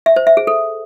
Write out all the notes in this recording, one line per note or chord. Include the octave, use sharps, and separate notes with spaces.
E5
C5
E5
G#4
A4